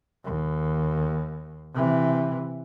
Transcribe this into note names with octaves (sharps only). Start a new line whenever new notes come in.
D#2
C3 E3